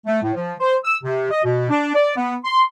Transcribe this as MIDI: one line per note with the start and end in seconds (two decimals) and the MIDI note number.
0.06 0.23 57
0.23 0.34 45
0.35 0.55 53
0.60 0.76 72
0.85 0.97 88
1.04 1.30 48
1.31 1.43 75
1.44 1.68 47
1.70 1.91 62
1.95 2.16 74
2.16 2.35 59
2.45 2.63 84